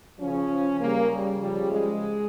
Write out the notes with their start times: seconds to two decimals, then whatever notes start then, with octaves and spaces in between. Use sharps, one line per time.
0.19 C#3 F3 C#4
0.80 C#3 G3 A#3
1.11 G3
1.41 C#3 F3 G3
1.71 G#3